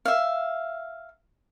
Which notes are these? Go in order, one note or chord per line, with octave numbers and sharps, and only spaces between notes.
E5 F5